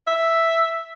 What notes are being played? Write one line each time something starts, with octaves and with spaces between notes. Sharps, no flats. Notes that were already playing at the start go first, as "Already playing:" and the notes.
E5